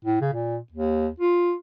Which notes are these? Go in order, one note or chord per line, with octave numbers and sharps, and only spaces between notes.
A2
C#3
A#2
D#2
F4